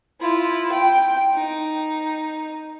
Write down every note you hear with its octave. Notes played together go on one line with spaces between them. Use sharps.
E4 F4
G5
D#4